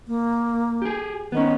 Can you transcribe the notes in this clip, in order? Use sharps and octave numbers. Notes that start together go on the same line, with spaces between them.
A#3
G4 G#4
D#3 B3 C#4